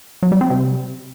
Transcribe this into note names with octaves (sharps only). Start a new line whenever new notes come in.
F#3
G3
C4
C3